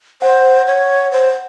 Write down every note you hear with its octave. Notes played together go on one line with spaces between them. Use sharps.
C5 F#5
C#5
C5